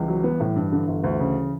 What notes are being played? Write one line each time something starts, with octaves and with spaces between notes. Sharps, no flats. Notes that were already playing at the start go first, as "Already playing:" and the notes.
Already playing: C#2 E3 G3
F#3
B3
A2
G2
D3
G1
D2
C#3